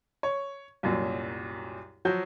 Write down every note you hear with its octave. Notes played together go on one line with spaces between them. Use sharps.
C#5
C2 F#2 A#2 F#3
F3 F#3 F#4 G6